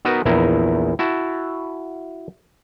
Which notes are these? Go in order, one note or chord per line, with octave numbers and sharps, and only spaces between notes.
B3 D#4 F#4 A#4 B4
A#1 E2 D#4 E4 A#5
E4 F#4 A5